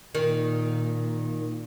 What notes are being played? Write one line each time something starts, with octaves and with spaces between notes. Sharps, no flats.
A#2 D#3